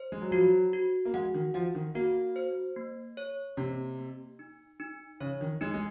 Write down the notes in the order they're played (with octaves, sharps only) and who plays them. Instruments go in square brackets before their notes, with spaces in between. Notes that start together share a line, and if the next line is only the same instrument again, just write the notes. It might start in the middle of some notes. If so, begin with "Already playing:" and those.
Already playing: [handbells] C5
[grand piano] G#3
F#3
[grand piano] F3 [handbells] F#4
[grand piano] F#3
[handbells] F#4
[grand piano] A#3
[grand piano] G#3 [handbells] F#5
[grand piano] D#3
[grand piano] F3 [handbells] F#5
[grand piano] D#3
[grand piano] A#3 [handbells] F#4
[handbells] C5
A#3
C#5
[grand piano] C3 [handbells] A#3
[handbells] A#3
D#4
D#4
[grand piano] C#3 [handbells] C#5
[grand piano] D#3
[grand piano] G#3 [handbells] D#4
[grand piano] G#3